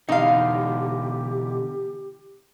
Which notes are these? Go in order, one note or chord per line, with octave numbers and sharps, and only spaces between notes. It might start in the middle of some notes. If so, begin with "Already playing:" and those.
B2 D3 E3 D#4 G4 F5